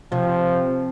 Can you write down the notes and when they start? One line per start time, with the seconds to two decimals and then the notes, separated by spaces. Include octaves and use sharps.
0.12 C3 F3